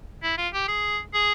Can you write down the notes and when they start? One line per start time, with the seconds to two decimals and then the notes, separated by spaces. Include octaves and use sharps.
0.23 E4
0.38 F4
0.53 G4
0.68 G#4
1.14 G#4